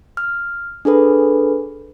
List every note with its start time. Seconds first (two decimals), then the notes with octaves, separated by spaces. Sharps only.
0.17 F6
0.85 D4 G#4 A4 B4